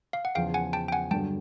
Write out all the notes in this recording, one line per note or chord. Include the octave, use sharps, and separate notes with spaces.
F5
F#5
E2 C#3 F3 F5 G5
F#5 G#5
G5 A5
G5
F#5 G#5
G2 D3 F#3 G5 A5